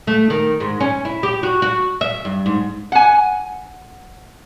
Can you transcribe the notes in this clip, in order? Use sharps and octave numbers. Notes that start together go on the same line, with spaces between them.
A3
D#3
G#2
C#4
E4
G4
F#4
F#4
E5
G2
G#2
F#5 G#5